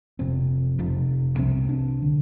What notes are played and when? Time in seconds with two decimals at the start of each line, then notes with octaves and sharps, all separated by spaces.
0.19 F1 F2 C3 C4
0.78 F1 F2 C3
1.38 C2 C3 C4
1.69 D4
2.02 D3